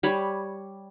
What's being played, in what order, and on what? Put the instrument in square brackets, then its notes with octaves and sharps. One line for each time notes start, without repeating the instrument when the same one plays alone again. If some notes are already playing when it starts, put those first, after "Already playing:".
[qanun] G3 C#5 B5